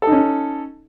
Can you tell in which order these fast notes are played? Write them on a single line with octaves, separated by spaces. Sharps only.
A4 D#4 C#4